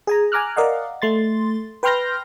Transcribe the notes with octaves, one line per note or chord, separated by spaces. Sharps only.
G#4 G#5 A#5
G#5 A#5 D6 F6 F#6
A#4 D5 D#5 F5 F#5
A3 C6 A6
B4 G5 C6 F6 G6 A#6